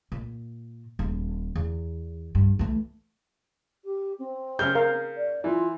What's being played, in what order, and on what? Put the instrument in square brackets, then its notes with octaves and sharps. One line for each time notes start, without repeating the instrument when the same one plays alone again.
[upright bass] A#2
D#1
E2
G2
E3 A3
[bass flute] G4
C4
[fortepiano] C#3 F6 [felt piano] G6
[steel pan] A#4 F5
[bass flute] D5
[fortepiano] E3 [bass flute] F4